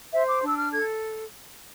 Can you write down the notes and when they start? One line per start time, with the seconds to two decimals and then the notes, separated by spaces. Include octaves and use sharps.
0.13 C5 E5
0.28 D6
0.43 D4 E6
0.58 F6
0.73 A4 G#6